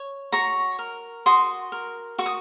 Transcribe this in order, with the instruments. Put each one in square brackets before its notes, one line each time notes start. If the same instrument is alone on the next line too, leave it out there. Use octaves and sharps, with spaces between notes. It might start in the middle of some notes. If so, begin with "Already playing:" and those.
Already playing: [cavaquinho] C#5
F#4 A#5 C#6
A#4
F#4 C6 D#6
A#4
F#4 C#6
D#6